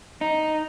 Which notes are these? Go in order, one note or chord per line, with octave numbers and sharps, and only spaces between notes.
D#4